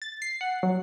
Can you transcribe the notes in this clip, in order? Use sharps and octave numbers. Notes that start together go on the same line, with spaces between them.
A6
C7
F#5
F#3